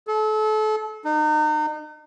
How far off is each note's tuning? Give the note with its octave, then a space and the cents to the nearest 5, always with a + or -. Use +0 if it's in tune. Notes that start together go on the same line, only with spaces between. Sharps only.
A4 -35
D#4 -35